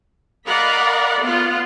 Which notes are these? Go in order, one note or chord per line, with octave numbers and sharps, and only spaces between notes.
A#4 D5 D#5 F5 F#5 B5
B3 F4 F#5